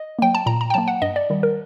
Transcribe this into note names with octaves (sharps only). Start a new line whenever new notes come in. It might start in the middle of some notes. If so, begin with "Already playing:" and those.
Already playing: D#5
F#3 A#3 G5
A5
A#2 A#5
A#5
G5
F#3 A#3 A5
F#5
G2 D#5
D5
D#3 G3
A#4